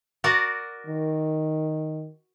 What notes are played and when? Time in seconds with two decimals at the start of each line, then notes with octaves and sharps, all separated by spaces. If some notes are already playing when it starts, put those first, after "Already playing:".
0.24 F#4 A#4 D5
0.87 D#3